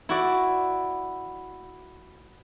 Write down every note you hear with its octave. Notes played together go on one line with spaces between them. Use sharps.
E4 F#4 D5